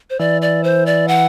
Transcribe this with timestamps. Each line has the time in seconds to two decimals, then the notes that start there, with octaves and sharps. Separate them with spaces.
0.10 C5
0.20 E3 D5
0.42 D5
0.64 C5
0.86 D5
1.08 F#5